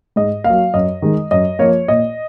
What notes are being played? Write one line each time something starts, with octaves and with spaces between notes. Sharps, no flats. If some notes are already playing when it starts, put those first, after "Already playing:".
G#2 D#5
A#3 F5
F#3
F#2 D#5
D#3 G#3
F#2 D#5
F3 A#3 C#5
A#2 D#5